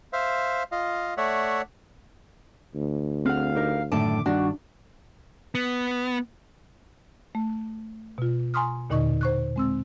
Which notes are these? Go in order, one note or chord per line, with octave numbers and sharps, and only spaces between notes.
C5 E5 F5
F4 D#5 F5
A3 C#5 D5 E5 F#5
D2
C4 G#4 F5 F#5
D#4 G4 A#4
F#2 A2 D3 D#3 A5 D6
G2 D#3 G3 D4 F#4
B3
A3
B2 F4
G#5 A#5 C6 C#6 D#6 F6
D#2 A#2 D3 D#4 D#5 C#6
C5 C#6 F#6
G#3 C4 E6